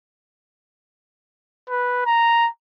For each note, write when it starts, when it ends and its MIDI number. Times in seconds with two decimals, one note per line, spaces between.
1.69 2.03 71
2.06 2.49 82